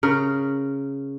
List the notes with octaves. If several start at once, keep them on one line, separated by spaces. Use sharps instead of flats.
C#3 A#4